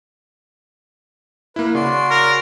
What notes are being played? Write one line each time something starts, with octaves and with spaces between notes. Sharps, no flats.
A#3 E4 B4
C#3 F#4 D5 C6
A#4